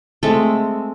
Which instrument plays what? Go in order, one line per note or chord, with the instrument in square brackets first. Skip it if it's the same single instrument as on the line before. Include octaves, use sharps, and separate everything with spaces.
[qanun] G#3 A3 C4 A4